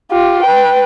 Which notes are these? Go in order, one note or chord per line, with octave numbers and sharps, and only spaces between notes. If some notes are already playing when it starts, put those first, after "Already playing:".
F4 G4
B4 G5